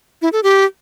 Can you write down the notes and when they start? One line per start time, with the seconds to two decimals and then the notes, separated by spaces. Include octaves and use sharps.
0.22 E4
0.33 A4
0.43 G4